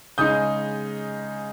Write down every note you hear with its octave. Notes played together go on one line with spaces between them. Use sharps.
C#3 G#3 D#4 D#6 G6